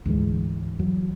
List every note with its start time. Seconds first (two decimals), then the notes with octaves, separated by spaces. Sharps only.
0.06 D2 G#2 E3 G#3
0.79 E2 F#3